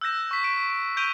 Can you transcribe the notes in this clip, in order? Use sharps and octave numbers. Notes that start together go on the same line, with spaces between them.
E6 F#6 G6 A#6 E7
C#6 B6
D7 E7
D7
C#6 G6 D7 D#7 F7 G7